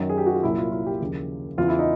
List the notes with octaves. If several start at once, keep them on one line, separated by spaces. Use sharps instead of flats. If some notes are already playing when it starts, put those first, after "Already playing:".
Already playing: F#2 D#3 F#3
G#4
G4
F#4
F4
C2 A#2 F#3 E4
F4
F4
G4
D#2 C#3 F3
E2 C#3 E3 F4
E4
D#4